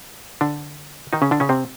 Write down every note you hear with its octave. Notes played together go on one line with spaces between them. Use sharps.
D3 D4
D#3 D#4
C#3 C#4
D3 D4
C#3 C#4
C3 C4